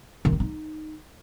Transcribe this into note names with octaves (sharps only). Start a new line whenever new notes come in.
D#3
A3
D#4